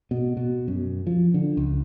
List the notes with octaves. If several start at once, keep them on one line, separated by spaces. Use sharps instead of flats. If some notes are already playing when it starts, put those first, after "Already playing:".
B2
B2
F#2
F3
D3
C#2